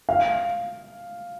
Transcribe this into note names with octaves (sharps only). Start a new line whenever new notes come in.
F5